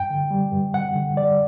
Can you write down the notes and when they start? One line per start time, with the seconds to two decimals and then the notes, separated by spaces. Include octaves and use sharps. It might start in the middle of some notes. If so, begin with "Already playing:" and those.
Already playing: G2 G5
0.10 D3
0.31 G3
0.52 G2
0.74 G2 F#5
0.95 D3
1.16 G3 D5